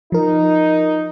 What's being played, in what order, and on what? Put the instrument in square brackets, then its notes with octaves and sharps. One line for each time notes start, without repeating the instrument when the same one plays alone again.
[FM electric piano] F3 A#4 [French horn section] D#4